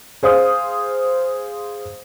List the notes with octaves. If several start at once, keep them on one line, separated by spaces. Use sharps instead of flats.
G#4 C5 F5 D#6